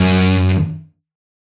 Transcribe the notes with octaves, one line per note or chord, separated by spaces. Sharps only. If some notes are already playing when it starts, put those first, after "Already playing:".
Already playing: F#2